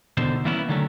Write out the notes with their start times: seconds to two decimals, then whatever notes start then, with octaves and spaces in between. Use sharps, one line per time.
0.17 E2 B2 D3 D#3 C5
0.45 E3 G3 A#3 B3 C#4 E4
0.69 D3 D#3 F#3 A3 C#4